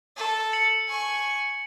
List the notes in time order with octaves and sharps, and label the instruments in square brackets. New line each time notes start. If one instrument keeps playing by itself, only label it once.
[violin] A4
[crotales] C#7 F#7
[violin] G#5 C#6